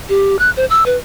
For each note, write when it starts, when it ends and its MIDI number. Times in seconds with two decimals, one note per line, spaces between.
0.09 0.39 67
0.39 0.50 90
0.57 0.65 72
0.70 0.84 88
0.86 0.97 71